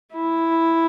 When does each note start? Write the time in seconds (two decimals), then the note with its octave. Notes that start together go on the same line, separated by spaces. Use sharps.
0.14 E4